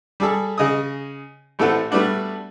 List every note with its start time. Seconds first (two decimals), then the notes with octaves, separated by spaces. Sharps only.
0.20 G3 G#4 A4
0.58 C#3 D#5 G#5 D#6
1.59 A1 A2 A3 C4 A4 F#5
1.91 G3 A3 B3 D4 F#4